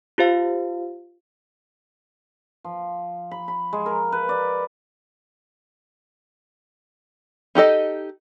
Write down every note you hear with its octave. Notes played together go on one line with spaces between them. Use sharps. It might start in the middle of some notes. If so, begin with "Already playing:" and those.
F4 G4 C5 F5
F3
B5
B5
G#3
A#4
B4
D5
D#4 G4 A4 D#5